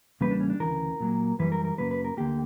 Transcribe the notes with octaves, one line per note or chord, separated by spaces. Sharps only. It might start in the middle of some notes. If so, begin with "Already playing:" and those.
E2 C#3 G3 A#3 B4
D4
C#4
D4
D2 C#3 E3 A#4
A#2 F#3 A#3
F#2 E3 G3 B4
A#4
A#4
F#2 C#3 F#3 A#3 B4
B4
A#4
D2 D3 A#3 G4